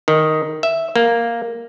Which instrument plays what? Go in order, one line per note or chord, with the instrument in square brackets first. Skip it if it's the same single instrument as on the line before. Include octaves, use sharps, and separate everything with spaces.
[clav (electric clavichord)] D#3
E5
A#3